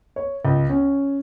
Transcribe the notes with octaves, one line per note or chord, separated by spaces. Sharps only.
C#5
C#2
C#4